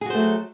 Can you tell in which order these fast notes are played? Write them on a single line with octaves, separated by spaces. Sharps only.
G#4 F#4 C5 A3 F#3